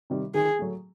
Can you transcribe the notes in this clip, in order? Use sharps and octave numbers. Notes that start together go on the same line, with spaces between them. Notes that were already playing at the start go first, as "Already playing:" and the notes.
C3 D#3 G3
D#3 G#4
F#3 A3